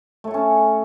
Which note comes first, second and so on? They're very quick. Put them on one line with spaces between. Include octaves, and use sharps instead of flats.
A3 C#5 A4 C#4